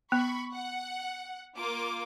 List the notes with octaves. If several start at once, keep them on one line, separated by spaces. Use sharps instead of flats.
B3 B5 C#6
F#5
A#3 F4 D6